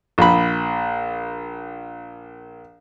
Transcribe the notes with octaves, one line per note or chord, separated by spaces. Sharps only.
A#1 B5